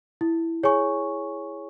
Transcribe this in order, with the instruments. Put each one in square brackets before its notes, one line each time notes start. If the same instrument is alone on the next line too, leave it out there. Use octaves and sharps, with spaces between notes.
[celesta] E4
G#4 C#5 G#5 C#6